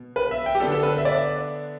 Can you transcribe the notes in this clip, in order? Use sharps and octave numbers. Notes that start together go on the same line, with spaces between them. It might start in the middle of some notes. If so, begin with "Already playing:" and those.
Already playing: B2
B4
E5
G5
G4
D3 B3 D4 A4
A4
B4
E5
D5